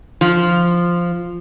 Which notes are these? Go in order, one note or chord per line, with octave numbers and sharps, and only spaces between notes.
F3